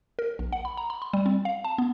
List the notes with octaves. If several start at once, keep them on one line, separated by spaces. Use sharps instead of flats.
A#4
A#1
F#5
B5
A#5
B5
C6
G3
C4
F5
A5
B3